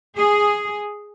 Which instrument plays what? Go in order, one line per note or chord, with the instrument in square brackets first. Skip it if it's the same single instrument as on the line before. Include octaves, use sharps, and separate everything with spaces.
[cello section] G#4